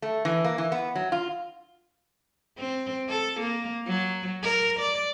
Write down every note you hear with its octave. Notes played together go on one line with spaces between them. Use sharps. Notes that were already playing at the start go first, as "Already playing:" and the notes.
A3
E3
A#3
E3
B3
F#3
F4
C4
A4
A#3
F#3
A#4
D5